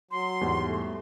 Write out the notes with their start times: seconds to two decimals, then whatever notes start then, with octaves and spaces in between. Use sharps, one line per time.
0.11 F#3 C6
0.41 E2 G#2 G3
0.65 A3